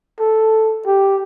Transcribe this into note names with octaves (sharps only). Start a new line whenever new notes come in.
A4
G4